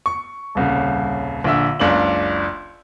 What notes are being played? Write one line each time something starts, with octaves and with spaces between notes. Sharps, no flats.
C#6
D#1 C2 C#3
A#1 D3 E5 E6
F#1 C#2 D4 F#7